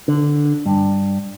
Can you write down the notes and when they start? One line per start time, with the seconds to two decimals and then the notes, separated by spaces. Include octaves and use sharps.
0.08 D3
0.66 G2